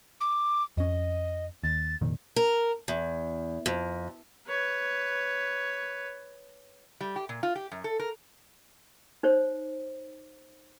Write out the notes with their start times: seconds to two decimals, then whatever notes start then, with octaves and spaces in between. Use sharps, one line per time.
0.20 D6
0.77 F2 C#4 D#5
1.63 D#2 A6
2.01 F1 A#2 D#3
2.36 A#4
2.88 E2
3.66 F2
4.47 B4 C#5
7.01 G3
7.16 G4
7.29 A#2
7.43 F4
7.55 G4
7.72 F#2
7.84 A4
7.99 A#4
9.23 D#4 C5 C#5